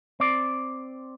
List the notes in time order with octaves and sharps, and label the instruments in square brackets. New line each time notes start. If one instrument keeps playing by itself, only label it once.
[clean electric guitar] C4 D5